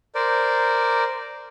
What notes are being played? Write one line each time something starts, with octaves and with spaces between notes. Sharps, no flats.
A#4 C5 D5